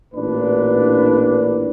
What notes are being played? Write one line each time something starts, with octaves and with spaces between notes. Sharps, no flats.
A1 A#2 D4 B4